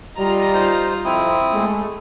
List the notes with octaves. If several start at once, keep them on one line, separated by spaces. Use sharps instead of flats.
G3 F4 D#5 A#5
D#4 C5
F2 C4 E4 D#6
G#3 A3